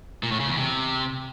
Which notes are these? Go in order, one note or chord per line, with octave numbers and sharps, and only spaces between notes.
A#2
A2
C#3
E2
C3